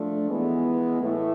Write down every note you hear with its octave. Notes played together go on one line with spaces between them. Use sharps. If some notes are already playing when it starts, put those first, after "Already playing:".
Already playing: F3 A3 D4
E3 G#3 B3
A2 E3 A3